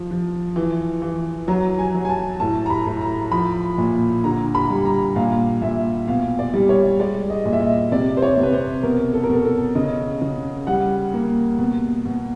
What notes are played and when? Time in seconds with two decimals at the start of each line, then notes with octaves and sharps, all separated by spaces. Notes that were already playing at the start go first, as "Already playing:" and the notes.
Already playing: F3
0.11 F3
0.56 E3
1.02 E3
1.48 F#3 A#5
1.79 G#5
1.94 F#3
2.05 G#5
2.10 A5
2.40 A2 A5
2.66 A#5
2.70 B5
2.86 A2
3.01 A#5
3.32 F3 B5
3.78 A#2
4.24 D3 A#5
4.55 B5
4.70 G3
4.85 A#5
5.16 A#2 F5
5.62 A#2 E5
6.07 B2 F5
6.39 D5
6.54 G3
6.69 C#5
7.00 G#3 D5
7.30 D#5
7.45 A#2
7.53 E5
7.61 D#5
7.92 C3 D5
8.17 C5
8.22 C#5
8.37 C3
8.43 B4
8.53 C5
8.83 B2 A#4
9.13 A4
9.24 A#4
9.29 B2 A4
9.45 A4
9.75 C#3 D#5
10.21 C#3
10.67 G3 F#5
11.13 A#3
11.59 B2
12.05 B2